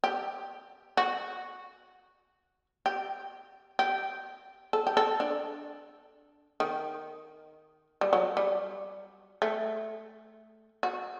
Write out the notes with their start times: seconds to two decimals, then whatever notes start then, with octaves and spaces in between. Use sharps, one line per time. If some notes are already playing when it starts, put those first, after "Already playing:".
0.04 G4
0.97 F#4
2.86 G4
3.79 G4
4.73 A4
4.87 G4
4.97 A4
5.20 D4
6.60 D#3
8.01 G3
8.13 F#3
8.37 G3
9.42 A3
10.83 F#4